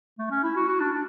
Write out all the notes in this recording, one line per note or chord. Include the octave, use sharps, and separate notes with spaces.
A3
C#4
E4
F#4
F#4
D4
D4